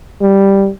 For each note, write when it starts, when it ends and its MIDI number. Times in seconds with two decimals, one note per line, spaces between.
0.21 0.69 55